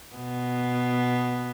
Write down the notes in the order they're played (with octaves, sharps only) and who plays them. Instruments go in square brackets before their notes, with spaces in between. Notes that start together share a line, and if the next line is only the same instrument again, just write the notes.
[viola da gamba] B2 B3